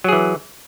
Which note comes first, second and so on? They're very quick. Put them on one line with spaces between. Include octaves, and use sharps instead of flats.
F#3 G#4 E3